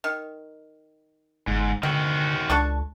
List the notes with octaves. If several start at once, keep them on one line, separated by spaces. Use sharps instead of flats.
D#3
G1 G#2
D3 D#3 C4 F#4
C#2 D4 A4 C#6